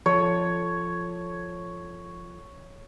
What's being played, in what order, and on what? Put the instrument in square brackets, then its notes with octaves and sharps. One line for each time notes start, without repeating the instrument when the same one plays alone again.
[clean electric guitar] F3 A4 [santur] C#5